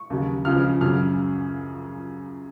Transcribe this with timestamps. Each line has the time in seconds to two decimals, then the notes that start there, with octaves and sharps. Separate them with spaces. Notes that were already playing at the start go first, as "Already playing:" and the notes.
Already playing: C#6
0.10 D#2 C#3 F#3
0.45 C#2 C#3 F3 F6
0.81 F#2 C#3 F#3 F6